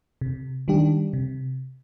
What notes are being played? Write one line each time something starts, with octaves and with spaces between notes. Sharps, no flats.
C3
D#3 G3 D4 G4
C3